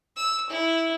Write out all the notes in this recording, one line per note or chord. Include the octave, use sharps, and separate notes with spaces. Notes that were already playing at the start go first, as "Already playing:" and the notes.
E6
E4